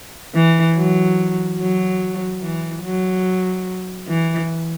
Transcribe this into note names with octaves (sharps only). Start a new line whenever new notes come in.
E3
F#3
F#3
E3
F#3
E3